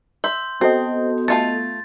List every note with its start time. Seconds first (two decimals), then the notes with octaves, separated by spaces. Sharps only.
0.24 E5 C6 G6
0.61 B3 C4 F#4 A4 D#5
1.28 A3 F4 A5 A6